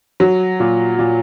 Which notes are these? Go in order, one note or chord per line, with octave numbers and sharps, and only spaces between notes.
F#3
A#2
A#2